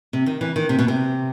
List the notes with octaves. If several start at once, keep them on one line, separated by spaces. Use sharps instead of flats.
C3
D#3
E3
D#3
C3
B2
C3